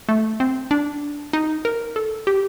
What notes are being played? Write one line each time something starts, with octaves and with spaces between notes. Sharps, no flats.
A3
C4
D4
D#4
A#4
A4
G4